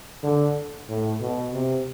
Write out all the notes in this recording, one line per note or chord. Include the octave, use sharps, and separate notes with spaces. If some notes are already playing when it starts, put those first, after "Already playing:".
D3
A2
B2
C3